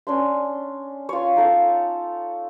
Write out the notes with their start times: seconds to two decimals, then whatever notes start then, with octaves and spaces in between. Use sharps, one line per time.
0.07 C#4 D4 C6
1.09 F4 C#5
1.36 D#4 A4 F5